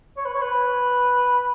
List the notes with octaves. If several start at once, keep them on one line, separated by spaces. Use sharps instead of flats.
C#5
B4
C#5
B4